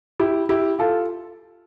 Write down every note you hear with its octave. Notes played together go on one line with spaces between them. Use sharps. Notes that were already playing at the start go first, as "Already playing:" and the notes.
E4 G4
E4 G4
F4 A4